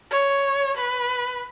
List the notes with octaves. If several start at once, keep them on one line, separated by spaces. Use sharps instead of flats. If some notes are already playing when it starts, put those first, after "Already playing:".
C#5
B4